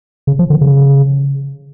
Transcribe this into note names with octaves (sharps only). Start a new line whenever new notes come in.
C#3
F3
D3
C#3